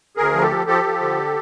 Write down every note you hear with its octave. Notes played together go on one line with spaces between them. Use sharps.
D2 G#4 A#4
F3
G4 A4
F3
F3 G4 A4
F3
D3